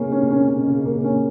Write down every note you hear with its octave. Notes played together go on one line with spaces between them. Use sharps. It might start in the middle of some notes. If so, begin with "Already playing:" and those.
Already playing: C#3 A#3 C#4
C#4
C#4
C#4
C#3
A#3
C#4